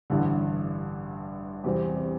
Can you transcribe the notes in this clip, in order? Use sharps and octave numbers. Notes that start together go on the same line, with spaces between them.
A1 G2 D3
E2 C3 G3 C4